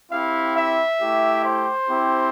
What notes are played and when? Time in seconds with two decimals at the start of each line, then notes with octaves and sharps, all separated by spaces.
0.11 C4 E4 G4 F5
0.55 E5
1.00 A3 E4 G4
1.43 C5
1.87 C4 E4 G4